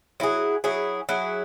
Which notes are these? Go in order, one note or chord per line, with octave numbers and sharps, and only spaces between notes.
F#3 E4 G#4
F#3 E4 G#4
F#3 E4 G#4